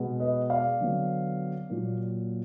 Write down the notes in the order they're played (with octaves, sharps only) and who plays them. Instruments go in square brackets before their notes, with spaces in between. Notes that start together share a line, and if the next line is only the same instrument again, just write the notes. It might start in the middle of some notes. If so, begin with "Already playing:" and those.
Already playing: [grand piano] B2 G#3 B3
B4 D#5
D5 F5
D3 F#3 B3
A#2 F#3 A#3